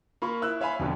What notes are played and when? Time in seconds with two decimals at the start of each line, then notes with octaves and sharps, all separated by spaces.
0.22 A#3 F4 B5 C#6
0.42 E4 E6 F#6
0.61 C#5 E5 F5 G#5 B5
0.79 F2 B2 D3